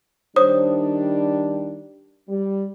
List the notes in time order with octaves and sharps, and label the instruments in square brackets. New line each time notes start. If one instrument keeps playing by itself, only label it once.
[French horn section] D#3 G3 D4 [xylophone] C5 C#5 D#6
[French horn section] G3